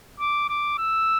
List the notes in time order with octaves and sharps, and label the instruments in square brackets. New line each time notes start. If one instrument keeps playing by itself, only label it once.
[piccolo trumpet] D6
D6
E6